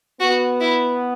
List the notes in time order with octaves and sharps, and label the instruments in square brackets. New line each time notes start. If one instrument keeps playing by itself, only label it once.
[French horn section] B3 [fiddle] F#4
[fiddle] E4